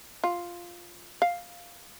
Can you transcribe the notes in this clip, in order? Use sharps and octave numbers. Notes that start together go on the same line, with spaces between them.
F4
F5